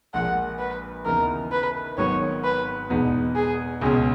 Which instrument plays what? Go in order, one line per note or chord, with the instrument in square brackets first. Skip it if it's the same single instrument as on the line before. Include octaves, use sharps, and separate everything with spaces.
[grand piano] A#1 A#2 G#3 [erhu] F#5
[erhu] B4
[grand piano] D#2 C#3 E3 B3 D#4 [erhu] A#4
[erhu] B4
[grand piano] G#1 G#2 D#3 F#3 B3 [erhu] C#5
[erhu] B4
[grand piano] E2 B2 G#3 B3 D#4
[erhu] G#4
[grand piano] C#2 B2 G#3 C#4 [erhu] G#4